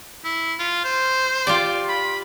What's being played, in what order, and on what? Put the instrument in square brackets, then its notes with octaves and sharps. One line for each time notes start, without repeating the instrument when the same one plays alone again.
[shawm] E4
F4
C5
[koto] F4 G4 D5
[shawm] B5